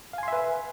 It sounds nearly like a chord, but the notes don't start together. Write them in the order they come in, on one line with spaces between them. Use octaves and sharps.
F5 G#5 C6 E5 B4